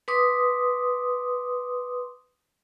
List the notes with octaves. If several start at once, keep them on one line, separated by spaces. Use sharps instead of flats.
B4 C6 D6 D#6